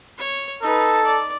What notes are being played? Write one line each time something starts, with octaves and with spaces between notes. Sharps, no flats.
C#5
D#4 A4 B4
D5